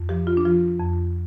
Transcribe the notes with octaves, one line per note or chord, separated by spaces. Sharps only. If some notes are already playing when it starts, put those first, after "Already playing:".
Already playing: F2
F3 G4
F4
D4
F3 F4
F2